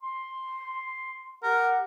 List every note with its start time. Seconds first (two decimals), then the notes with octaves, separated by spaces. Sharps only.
0.02 C6
1.43 G4 A#4 F#5